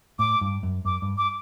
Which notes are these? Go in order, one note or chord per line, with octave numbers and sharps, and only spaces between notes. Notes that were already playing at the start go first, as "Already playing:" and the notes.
A2 D6
G2
F#2
F#2 D6
G2
D6